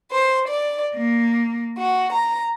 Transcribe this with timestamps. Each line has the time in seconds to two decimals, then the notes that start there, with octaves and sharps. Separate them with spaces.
0.10 C5
0.48 D5
0.94 A#3
1.78 F#4
2.13 A#5